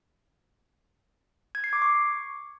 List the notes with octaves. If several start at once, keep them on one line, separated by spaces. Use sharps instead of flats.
G#6
C7
D6
C#6